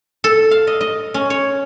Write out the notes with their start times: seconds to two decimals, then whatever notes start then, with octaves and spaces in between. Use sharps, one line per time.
0.24 A4
0.51 F5
0.67 D#5
0.81 D#5
1.14 C#4
1.30 C#5